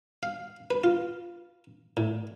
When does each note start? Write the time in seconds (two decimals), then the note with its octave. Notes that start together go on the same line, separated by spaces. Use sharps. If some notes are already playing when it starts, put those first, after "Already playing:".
0.23 F5
0.71 B4
0.84 F4
1.97 A2